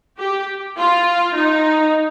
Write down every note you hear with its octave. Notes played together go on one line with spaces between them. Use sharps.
G4
F4
D#4